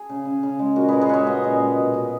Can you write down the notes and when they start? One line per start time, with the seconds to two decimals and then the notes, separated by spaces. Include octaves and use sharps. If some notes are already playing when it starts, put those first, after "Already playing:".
Already playing: G#4
0.09 C#3
0.25 C#3
0.43 C#3
0.59 G#3
0.76 A#2 F#4 A#4
0.88 G#3 G#4 B4
1.01 G#4 B4
1.09 C#4 C#5 E5 F#5
1.27 C#4 D#5 F#5
1.44 A#2
1.60 G#3
1.77 B2
1.94 B2